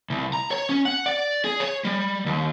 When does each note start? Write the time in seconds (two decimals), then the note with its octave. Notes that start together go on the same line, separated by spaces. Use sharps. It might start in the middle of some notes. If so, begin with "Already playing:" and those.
0.10 C2
0.33 A#5
0.51 C#5
0.69 C#4
0.85 F#5
1.06 D5
1.45 G#4
1.60 C#5
1.85 G3
2.26 D#2